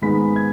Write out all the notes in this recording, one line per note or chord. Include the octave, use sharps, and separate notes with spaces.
G#2 D#3 G#3 B3 B5 B6
G#6